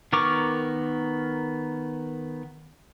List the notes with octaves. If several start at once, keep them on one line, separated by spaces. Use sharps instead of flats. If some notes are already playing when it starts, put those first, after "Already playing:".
D#3 B3 A#4 C#6 D6